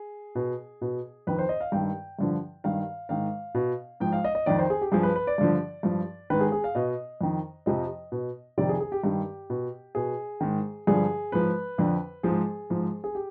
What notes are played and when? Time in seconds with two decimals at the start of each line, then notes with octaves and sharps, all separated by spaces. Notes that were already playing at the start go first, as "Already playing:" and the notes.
Already playing: G#4
0.35 B2
0.82 B2
1.27 F2 D#3 B4
1.39 C5
1.49 D#5
1.61 F5
1.72 G2 D#3 G5
2.19 G2 D3 F3
2.64 G2 D#3 F5
3.09 G#2 D#3 F5
3.55 B2
4.00 G#2 F3 G5
4.13 F5
4.24 D#5
4.35 D#5
4.46 F2 D#3 D5
4.59 C5
4.70 G#4
4.81 G4
4.92 G2 F3 G#4
5.03 B4
5.16 B4
5.27 D5
5.38 G2 D3 F3
5.83 G2 F3
6.30 G#2 D#3 B4
6.40 G#4
6.52 G#4
6.64 F5
6.75 B2 D#5
7.21 F2 D#3
7.66 F2 C3 F3 D#5
8.12 B2
8.58 F2 C3 D#3 D5
8.69 G#4
8.80 G#4
8.92 G4
9.04 G2 D#3 G4
9.50 B2
9.95 B2 G#4
10.41 G#2 D#3
10.87 G2 D3 F3 G#4
11.32 G#2 F3 B4
11.78 F2 D3 F3
12.23 G#2 F3 G#4
12.70 G#2 F3
13.04 G#4
13.15 G4